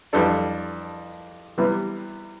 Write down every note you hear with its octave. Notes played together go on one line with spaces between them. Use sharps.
F2 E3 G3 D4 A4
C3 E3 G3 B3